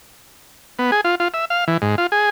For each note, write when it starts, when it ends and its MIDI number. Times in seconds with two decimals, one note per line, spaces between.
0.79 0.91 59
0.92 1.01 68
1.05 1.15 65
1.20 1.28 65
1.34 1.45 76
1.50 1.65 77
1.68 1.77 52
1.82 1.96 44
1.98 2.07 65
2.12 2.30 68